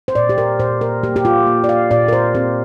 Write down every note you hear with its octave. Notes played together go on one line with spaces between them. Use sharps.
C5
A#2 D5
G4
A#4
A#2 C5
A#4
A#3 G4
G4
F4
A#3
D5
F5
A#2 D5
A#4
C5
C4 G4